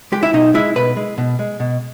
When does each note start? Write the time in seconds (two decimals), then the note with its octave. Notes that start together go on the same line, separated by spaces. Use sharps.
0.12 G#3 G4
0.23 E4
0.33 B2 D#4
0.54 G#3 E4
0.75 B2 B4
0.97 G#3
1.18 B2
1.39 G#3
1.60 B2